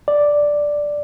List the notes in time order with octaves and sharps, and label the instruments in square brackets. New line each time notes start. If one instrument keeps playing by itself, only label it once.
[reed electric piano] D5